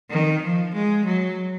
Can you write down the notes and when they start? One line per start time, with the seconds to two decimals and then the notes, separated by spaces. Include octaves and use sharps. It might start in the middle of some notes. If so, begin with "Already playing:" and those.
0.10 D#3
0.41 F3
0.74 G#3
1.05 F#3